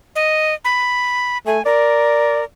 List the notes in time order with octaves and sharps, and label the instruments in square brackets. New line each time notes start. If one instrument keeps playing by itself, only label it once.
[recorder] D#5
B5
[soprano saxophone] A3 [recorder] G#5
[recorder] A#4 [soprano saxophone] D5